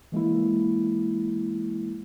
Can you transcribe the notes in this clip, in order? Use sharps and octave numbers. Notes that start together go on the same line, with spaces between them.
E3 G#3 A#3 E4